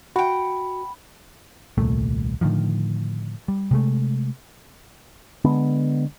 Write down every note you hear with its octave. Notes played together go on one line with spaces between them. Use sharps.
F#4 F#5 G5 B5
D#1 C2 A#2 A3
A2 D3 D#3 F3
G3
C3 G#3 A3
D3 G#3 B3